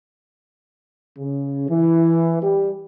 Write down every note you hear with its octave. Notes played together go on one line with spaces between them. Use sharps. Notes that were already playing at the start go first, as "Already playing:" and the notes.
C#3
E3
G3